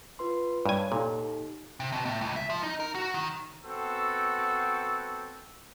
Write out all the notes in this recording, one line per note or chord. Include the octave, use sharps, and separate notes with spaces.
F4 B4 C6
G2 C#5 G#5
A#2 D#4 G4 A4
C3
B2
A2
C#2
E5
F3
D#4
A#4
F#4
D#3
B3 C4 F#4 A4